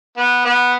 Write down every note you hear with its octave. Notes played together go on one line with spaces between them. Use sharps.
B3
B3